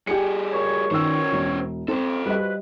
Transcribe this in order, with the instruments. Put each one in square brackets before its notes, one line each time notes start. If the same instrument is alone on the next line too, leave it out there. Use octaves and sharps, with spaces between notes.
[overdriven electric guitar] G3 G#4 [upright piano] G4 C#7
[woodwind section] A#2 F#4 C#5
[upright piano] D#3 E6 [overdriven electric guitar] C#4 C5
[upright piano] E1
[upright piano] C4 [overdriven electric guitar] A4 C5
[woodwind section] F3 F#4 B4 [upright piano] G3 D#5